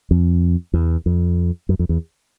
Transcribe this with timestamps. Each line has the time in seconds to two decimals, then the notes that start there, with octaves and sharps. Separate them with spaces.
0.11 F2
0.74 E2
1.06 F2
1.69 F#2
1.79 F2
1.89 E2